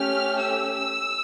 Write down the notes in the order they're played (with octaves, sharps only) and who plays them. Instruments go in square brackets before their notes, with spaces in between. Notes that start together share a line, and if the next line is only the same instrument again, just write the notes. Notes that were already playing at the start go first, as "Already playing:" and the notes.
Already playing: [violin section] A3 C#4 G4 F6
E6